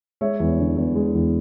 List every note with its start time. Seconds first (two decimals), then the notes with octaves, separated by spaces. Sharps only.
0.21 G#3 C#5 E5
0.40 E2
0.59 D3
0.77 E2
0.95 G#3
1.15 E2